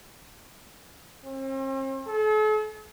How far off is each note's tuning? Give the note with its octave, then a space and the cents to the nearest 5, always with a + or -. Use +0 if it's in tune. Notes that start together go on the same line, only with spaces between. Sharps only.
C4 +45
A4 -45